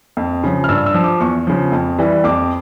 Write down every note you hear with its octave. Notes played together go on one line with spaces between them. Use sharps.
F2
C#3 F3
F6
G2 E6
E6
F3
D6
E2 C#6
C#3 F3
F2
E3 G3
F2 D6